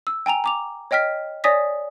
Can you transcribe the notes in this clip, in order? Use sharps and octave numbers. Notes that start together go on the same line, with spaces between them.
E6
G5 G#5 A#5 F7
A#5 D6 F7
C#5 D#5 G5 F6 B6
C#5 D5 G#5 D#6 A#6 B6